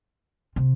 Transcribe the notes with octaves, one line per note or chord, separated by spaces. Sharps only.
C3